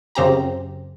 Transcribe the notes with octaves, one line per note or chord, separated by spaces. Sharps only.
F#2 C#3 C4 G4 A#5